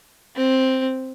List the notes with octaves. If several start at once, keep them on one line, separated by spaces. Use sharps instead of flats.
C4